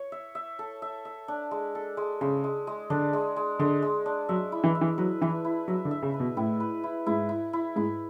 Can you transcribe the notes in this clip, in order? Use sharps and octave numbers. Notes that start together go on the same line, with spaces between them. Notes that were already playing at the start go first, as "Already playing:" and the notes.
Already playing: C#5
E5
E5
A4
E5
E5
D4
G#3
A4
G#3
C#3 G#3
G#3
G#3
D3 D4
G#3
G#3
D3 G#3
G#3
D4
F#3 E5
E4
E3
E5
E3
F#3 B4
E3 E4
E4
F#3 E5
D3
E5
C#3
B4
B2
A2 E4
B4
E4
G#2 E4
E4
E4
G#2 E4